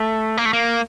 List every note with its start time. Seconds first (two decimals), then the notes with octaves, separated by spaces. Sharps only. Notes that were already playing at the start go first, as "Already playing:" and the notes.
Already playing: A3
0.37 A#3
0.45 A3
0.53 A#3